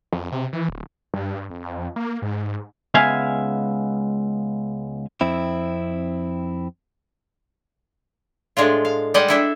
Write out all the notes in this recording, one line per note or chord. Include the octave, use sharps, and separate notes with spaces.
F2
C3
E3
D1
G2
F2
A#3
G#2
C#2 G#3 B3 E5 F5 G#5
F2 C4 E4
A2 G#3 D4 F4
F5
G3 G#3 D5 D#5 F#5 A5
D4 E4 A4